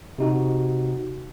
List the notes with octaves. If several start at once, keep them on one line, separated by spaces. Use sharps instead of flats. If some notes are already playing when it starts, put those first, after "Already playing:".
C3 D#4 F#4